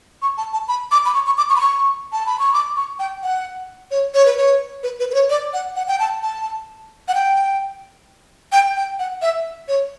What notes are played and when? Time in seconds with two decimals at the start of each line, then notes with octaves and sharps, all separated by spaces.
0.22 C#6
0.38 A5
0.53 A5
0.68 B5
0.91 D6
1.05 B5
1.14 C#6
1.26 C#6
1.38 D6
1.49 C#6
1.56 B5
1.61 C#6
2.13 A5
2.26 B5
2.39 C#6
2.53 D6
2.76 C#6
2.99 G5
3.23 F#5
3.91 C#5
4.14 C#5
4.26 B4
4.38 C#5
4.83 B4
5.00 B4
5.10 B4
5.14 C#5
5.30 D5
5.54 F#5
5.76 F#5
5.88 G5
6.00 A5
6.23 A5
7.08 F#5
7.15 G5
8.52 G5
8.76 G5
8.99 F#5
9.22 E5
9.68 C#5